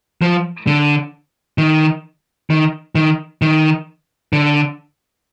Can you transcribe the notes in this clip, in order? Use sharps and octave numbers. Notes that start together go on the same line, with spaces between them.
F3
D3
D#3
D#3
D#3
D#3
D3